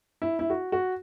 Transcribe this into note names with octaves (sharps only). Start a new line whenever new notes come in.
E4
E4
F#4
F#4